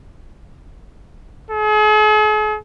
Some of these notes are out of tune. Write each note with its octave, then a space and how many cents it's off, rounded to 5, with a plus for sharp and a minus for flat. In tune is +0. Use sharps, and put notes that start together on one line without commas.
G#4 +45